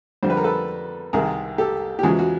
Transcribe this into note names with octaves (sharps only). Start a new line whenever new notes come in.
F2 D3 G3 C5
B4
A#4
A4 B4
C2 C3 D#3 G#4 A#4
G4 A4
G4
E2 C#3 F3 G#3 F#4 G#4
F#4